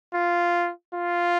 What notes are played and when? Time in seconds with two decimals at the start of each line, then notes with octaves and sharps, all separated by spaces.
0.14 F4
0.95 F4